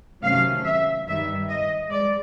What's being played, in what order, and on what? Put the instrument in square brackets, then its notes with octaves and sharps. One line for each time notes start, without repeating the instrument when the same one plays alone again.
[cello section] C3 D#3 F#3 A3 C#4 F5
E5
G2 D#3 G3 E5
D#5
G#3 D5